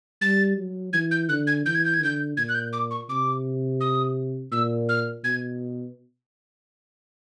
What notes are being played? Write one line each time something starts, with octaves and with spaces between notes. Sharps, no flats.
G3 A6
F#3
E3 G#6
G6
D3 F#6
G#6
E3 G6
G#6
G6
G#6
D3 G6
A#2 G#6
F#6
G6
D6
C#6
C3 D6
D#6
A#2 E6
F6
B2 G#6